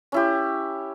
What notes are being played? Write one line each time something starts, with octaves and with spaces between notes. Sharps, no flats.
C#4 E4 G4